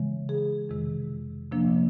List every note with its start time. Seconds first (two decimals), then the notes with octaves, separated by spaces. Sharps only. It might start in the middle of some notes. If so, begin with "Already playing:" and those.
Already playing: C#3 E3 G#3
0.29 G#4
0.69 F2 C3 D#3 G#3
1.52 C3 F3 A#3 D4